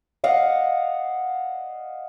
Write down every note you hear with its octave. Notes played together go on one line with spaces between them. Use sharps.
D5 D#5 F5 F#5